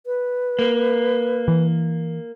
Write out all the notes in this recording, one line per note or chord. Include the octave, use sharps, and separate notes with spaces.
B4
A#3
E3